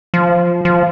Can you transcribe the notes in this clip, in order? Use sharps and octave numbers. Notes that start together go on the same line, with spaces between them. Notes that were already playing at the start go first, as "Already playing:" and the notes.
F3
F3